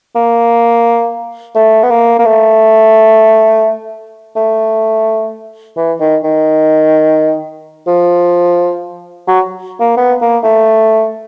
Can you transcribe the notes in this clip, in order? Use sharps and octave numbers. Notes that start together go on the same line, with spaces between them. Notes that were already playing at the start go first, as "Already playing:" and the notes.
A#3
A3
B3
A#3
A#3
A3
A3
E3
D#3
D#3
F3
F#3
A#3
B3
A#3
A3